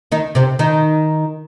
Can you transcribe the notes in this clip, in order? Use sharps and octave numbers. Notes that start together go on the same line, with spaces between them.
D#3 D#4
C3 C4
D#3 D#4